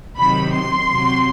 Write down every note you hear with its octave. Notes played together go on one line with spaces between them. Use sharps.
C3 D#3 F#3 B5
C6
C3 F#3